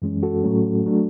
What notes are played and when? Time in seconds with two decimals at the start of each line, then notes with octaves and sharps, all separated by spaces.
0.02 F#2 E3 G#3 C#4
0.23 F#4 A4
0.44 A2 F#3 A3 C#4
0.86 F#3 A3 D4